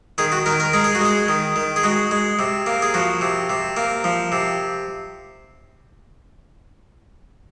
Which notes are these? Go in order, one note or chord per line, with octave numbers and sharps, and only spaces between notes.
D#3 G#4
F#4
D#3 A#4
A#4
G#3 A#4
G#4
F#4
G#3 G#4
D#3
D#3
G#4
G#3 F#4
G#3
C3
A#3
G#4
F3 F#4
C3
C3
A#3
F3
C3